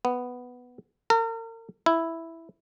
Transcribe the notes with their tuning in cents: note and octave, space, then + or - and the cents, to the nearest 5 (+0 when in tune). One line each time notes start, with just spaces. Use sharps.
B3 +5
A#4 -40
E4 +0